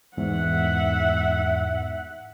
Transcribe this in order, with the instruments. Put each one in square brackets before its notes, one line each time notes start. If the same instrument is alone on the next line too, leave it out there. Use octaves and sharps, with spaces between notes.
[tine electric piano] E2 G#2 [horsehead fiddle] E5 F#5